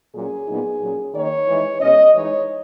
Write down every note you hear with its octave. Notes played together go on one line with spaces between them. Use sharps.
A#2 F#3 C#4 G#4
A#2 F#3 B3 D#4
A#2 F#3 C#4
D#3 A#3 D#4 C#5
E3 G#3 D#4
B2 G#3 C#4 D#5
E3 G#3 D#4 C#5